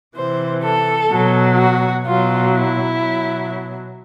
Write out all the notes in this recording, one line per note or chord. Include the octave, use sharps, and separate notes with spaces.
C3 E3 C5
A4
B2 F#3
F#4
B2 F#3 F4
E4
B2 F#3